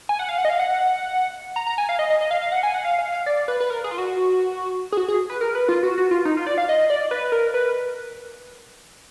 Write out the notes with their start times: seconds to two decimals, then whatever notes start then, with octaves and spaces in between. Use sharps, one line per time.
0.09 G#5
0.19 F#5
0.29 F5
0.38 F#5
0.45 D#5
0.50 F5
0.60 F#5
1.56 A#5
1.67 A#5
1.78 G#5
1.89 F5
1.99 D#5
2.10 D#5
2.21 D#5
2.31 F5
2.41 F5
2.52 F#5
2.63 G#5
2.74 F#5
2.85 F5
2.99 F5
3.12 F5
3.26 D5
3.48 B4
3.60 B4
3.70 A#4
3.84 G#4
3.91 F4
3.98 F#4
4.92 G#4
4.97 F#4
5.08 G#4
5.30 B4
5.41 A#4
5.55 B4
5.69 F4
5.83 F#4
5.98 F#4
6.11 F4
6.25 D#4
6.37 F4
6.47 D5
6.58 F5
6.69 D#5
6.90 D5
7.11 B4
7.32 A#4
7.54 B4